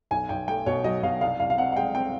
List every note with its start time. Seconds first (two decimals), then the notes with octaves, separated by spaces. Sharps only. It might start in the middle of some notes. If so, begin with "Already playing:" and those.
0.11 B1 G#5
0.29 B1 G5
0.48 A3 G5
0.66 B2 C#5
0.84 F#3 D#5
1.03 B2 F5
1.21 C2 F5
1.40 C2 F5
1.50 F5
1.57 C4 F#5
1.72 F#5
1.76 G#3 G5
1.95 C4 G5